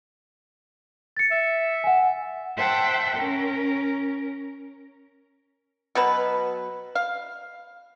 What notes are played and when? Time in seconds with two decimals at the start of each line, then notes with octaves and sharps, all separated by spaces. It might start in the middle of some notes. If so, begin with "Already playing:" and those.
1.17 A6 C#7
1.31 E5
1.84 F#5 G#5
2.56 C5 E5 F#5 G5 A5
3.12 C#4 A#4
5.95 B2 F#3 B4
6.95 F5